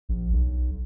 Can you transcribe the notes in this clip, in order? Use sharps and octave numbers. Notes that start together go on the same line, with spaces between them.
A#1
B1